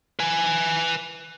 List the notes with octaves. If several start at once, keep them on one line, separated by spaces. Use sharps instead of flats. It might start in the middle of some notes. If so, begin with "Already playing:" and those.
B4 G#5